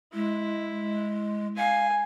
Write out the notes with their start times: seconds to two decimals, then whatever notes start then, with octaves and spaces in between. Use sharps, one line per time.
0.14 G#3 E4
1.57 F5 G#5